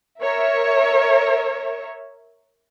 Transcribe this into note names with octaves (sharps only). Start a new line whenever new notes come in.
A#4 C#5 E5